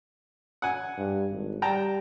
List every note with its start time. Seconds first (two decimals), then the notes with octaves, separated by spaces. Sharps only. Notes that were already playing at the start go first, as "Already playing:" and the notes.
0.62 F#5 G#5
0.97 G2
1.31 G#1
1.62 G3 G5 A5 A#5